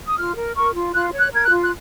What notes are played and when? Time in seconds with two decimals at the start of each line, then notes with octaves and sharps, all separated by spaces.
0.05 D#6
0.17 F4 F6
0.36 A#4
0.55 A#4 C#6
0.74 F4
0.94 F4 F#6
1.12 C#5
1.19 F#6
1.31 A#4 G#6
1.44 F#6
1.50 F4
1.63 F#6